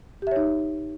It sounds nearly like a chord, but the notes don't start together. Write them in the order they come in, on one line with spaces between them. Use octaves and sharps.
G4 E5 C#5 D#4